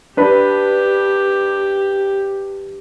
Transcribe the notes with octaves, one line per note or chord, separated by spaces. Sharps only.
D4 G4 B4 B5